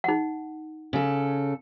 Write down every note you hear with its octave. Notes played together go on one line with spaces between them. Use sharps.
D#4 F#5
C#3 A4